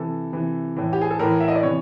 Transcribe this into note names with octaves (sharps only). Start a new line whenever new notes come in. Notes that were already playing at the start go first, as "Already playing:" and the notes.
Already playing: C3 E3 A4
C3 E3
A2 E3
G4
G#4
A4
A2 E3 A#4
E5
D#5
D5
C3 E3 C#5